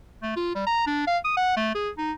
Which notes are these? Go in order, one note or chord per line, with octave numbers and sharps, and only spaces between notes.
A3
F4
G3
A#5
D4
F5
D#6
F#5
A3
G#4
D#4